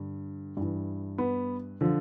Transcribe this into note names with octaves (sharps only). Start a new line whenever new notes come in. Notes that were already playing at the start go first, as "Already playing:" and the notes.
Already playing: G2 D3
G2 E3
B3
D3 F3